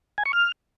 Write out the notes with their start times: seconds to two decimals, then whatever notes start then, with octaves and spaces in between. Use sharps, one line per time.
0.18 G#5
0.26 C#6
0.33 F6